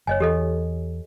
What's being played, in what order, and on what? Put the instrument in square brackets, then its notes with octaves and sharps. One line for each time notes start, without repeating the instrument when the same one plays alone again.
[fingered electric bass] F#1 [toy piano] C#5 D#5 G#5
[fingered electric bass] E2 [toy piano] G4 A4 D#5